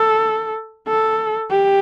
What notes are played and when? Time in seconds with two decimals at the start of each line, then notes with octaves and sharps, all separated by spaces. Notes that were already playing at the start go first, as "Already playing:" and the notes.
Already playing: A4
0.88 A4
1.51 G4